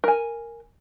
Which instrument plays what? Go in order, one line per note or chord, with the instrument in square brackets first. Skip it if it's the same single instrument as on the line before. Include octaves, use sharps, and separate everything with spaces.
[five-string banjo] A#4 G#5